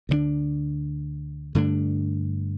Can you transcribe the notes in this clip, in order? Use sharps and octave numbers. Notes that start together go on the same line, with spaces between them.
D2 D3 G3 D4
G2 D3 A3 D4